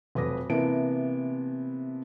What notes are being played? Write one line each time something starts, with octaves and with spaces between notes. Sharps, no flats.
F1 F#3 B4 D6 D#6 A#6
C3 E3 A#3 B3 A5 D7